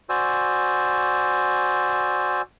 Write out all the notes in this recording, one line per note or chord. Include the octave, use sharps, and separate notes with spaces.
F#4 C5 D5 G#5 E6